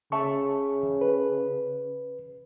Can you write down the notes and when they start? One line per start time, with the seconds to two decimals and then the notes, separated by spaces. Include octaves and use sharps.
0.12 C#3 E5 A5 C#6
1.01 B4